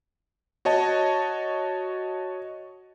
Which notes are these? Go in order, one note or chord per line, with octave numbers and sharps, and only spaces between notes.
F#4 C#5 D#5 A5